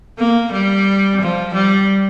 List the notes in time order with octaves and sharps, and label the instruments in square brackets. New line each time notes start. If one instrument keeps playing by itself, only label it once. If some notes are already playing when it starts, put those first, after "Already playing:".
[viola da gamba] A#3
G3
F3
G3